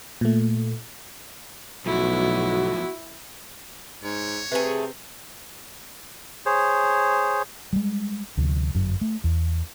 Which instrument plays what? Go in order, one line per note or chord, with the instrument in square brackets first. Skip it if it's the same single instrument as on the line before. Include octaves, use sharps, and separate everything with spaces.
[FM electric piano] A#2 A3
[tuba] B1 [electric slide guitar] F3 A3 B3 [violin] E4 [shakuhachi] F#4
[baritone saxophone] G#2 [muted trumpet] C#5
[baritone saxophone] C3 [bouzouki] A3 G#4 [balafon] B4
[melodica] G#4 C5 C#5
[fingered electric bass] G3 G#3
D2 C3 F3
G1 F#2 F#3
A3
E2